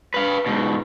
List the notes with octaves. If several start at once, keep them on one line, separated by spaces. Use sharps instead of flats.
B4 F5
G#2 B2